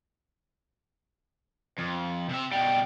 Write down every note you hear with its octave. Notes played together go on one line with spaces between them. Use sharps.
F2
C3 E5
B2 G3 G5